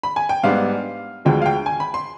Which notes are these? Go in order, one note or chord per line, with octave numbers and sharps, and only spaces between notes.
B5
G#5
G5
G#2 G3 B3 D4 F5
D2 D3 F3 G#3 G5
F5
G5
G#5
B5
C6